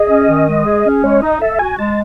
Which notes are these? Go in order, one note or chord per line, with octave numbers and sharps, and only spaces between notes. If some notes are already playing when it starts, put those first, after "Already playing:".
Already playing: G#4 D#5
C#4
D#3
G#3
G#4
C#4
G#3 C#5
D#4 D#5
A4 E5
F#4 G#5
G#3 A5